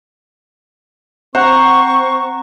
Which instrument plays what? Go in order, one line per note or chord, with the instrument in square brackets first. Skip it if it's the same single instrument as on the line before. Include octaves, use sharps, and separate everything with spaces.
[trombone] C4 [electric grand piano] C5 [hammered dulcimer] F#5 A#5 [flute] C#6